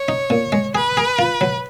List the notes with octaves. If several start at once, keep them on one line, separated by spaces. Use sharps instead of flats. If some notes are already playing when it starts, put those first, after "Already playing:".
Already playing: C#5
D#4
A#2
G#3
G#4 B4
G#4
F4
F#3